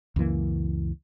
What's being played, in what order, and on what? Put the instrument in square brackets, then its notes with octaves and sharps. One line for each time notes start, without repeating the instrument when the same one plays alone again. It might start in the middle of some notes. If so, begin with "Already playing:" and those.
[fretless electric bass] C#2 F#2 E3 A#3